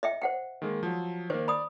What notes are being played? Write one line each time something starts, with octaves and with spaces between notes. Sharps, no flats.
D#5 E5 G5
C5 F#5 G5
D#3 G#3 A#3
F3 F#3
D#3 A#3 C5
D5 B5 D#6